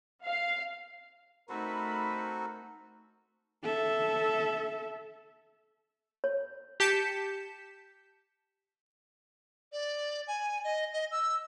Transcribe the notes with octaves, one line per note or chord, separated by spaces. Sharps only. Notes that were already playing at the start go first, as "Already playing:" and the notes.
F5
A3 C4 D#4 F#4 A4 A#4 B5
A4 E5
C#5
G4 A5 G6 B6 C#7 E7
D5
G#5
D#5
D#5
E6